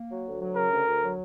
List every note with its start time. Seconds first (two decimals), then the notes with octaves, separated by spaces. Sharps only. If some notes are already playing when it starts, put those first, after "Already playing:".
Already playing: A#3
0.09 F#3
0.24 D2
0.40 F#3
0.56 C#3 A#4
0.71 D2
0.87 D2
1.02 F#3